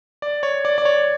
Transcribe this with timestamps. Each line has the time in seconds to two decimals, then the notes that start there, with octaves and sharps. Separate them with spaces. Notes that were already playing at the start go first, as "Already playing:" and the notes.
0.22 D5
0.43 C#5
0.65 D5
0.78 D5
0.85 C#5